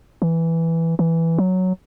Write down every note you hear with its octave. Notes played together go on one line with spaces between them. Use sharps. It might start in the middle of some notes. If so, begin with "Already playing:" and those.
E3
E3
F#3